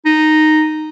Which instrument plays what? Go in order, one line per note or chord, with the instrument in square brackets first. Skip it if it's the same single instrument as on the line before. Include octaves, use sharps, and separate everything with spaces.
[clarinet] D#4